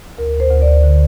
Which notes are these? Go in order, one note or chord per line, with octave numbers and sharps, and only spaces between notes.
D2 A#4
D2
C5
D2
D5
D2
D3